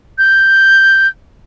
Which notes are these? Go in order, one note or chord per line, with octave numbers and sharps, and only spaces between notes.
G6